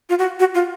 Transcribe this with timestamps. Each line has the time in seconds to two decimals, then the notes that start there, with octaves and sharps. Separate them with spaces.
0.10 F4
0.19 F#4
0.40 F#4
0.55 F4